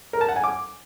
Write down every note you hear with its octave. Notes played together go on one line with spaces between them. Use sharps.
A#4
A5
F#5
G#5
D6